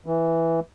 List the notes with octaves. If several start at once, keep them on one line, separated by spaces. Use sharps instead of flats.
E3